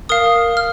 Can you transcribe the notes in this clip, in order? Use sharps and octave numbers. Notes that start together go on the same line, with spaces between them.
A#4 F5 D#6
F6